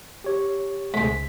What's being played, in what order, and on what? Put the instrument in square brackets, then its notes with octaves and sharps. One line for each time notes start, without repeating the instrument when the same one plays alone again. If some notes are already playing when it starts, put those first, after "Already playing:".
[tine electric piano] G4 C#5
[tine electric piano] C#2 B6 [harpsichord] G#2 G#3